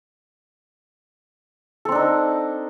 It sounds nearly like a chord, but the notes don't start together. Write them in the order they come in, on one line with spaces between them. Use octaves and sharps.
A4 C4 D4 D#4